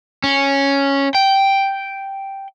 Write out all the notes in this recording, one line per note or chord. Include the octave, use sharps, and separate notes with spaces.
C#4
G5